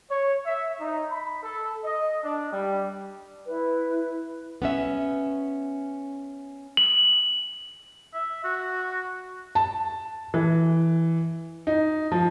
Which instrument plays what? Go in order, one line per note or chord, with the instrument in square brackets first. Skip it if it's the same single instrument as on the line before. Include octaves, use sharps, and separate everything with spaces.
[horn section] C#5
E5
D#4
B5
A4
D#5
D4
G3
[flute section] E4 B4
[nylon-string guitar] B3 C#4 E5
[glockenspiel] F#7
[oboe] E5
F#4
[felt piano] A5
E3
D#4
F3